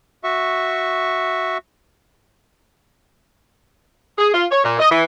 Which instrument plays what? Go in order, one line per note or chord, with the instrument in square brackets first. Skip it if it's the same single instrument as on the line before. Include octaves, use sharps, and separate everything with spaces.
[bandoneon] F#4 E5 C#6
[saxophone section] G#4
F4
C#5
A#2
D#5
E3